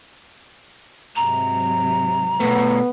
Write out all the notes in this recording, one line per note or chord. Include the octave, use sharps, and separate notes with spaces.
G#2 C3 F#3 A#5
B2 A3 B3